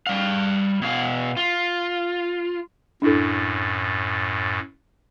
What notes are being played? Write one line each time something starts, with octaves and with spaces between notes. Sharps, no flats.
G3 F5
B2 F5
F4
F#2 A2 D4 E4 A4